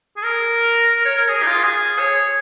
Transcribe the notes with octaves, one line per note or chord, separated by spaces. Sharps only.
G#4
A#4
A#4
C#5
A#4
G#4
D#4
F4
G#4
C#5